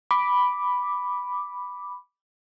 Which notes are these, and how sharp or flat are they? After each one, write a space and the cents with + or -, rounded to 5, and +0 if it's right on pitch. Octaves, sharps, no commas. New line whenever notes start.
B5 +0 D6 +0